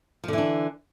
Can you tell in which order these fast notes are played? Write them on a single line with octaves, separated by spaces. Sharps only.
F3 D3 E3 D4